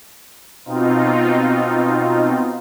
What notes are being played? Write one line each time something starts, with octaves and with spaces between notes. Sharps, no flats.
B2 C4 D#4 F4